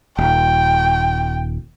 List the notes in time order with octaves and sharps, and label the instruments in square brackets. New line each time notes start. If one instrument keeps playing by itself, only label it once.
[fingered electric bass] D#1 [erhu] G5